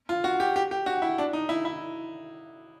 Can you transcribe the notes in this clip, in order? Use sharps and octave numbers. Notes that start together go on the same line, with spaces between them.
F4
F#4
G4
G4
G4
F#4
E4
D4
D#4
E4
E4